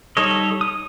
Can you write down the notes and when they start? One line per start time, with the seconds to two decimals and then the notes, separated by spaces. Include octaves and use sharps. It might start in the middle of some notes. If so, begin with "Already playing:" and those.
0.17 G3 D#4 A4 C#5 D#5
0.61 D#6